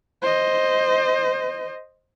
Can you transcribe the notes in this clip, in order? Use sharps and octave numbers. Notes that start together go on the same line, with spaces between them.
C5 D#5